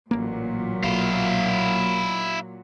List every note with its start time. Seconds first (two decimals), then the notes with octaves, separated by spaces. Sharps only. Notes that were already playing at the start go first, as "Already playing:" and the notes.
0.11 A1 A#2 F#3 A#3
0.83 B1 E4 F5